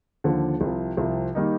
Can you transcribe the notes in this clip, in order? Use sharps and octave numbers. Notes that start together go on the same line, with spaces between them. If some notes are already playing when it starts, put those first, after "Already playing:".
D#2 D3 F3
C2 C3 F3
C2 C3 F3
D#3 G3 A#3 D#4